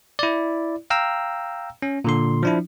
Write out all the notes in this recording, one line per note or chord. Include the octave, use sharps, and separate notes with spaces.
E4 D5
F5 G5 A#5 E6
C#4
A#2 D3 C6
F3 D4 E4